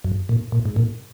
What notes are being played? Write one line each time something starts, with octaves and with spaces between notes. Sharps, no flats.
F#2
A#2
A#2
G#2
A#2